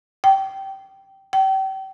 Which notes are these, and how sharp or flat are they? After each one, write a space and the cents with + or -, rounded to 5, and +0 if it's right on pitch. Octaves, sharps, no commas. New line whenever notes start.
G5 -15
G5 -35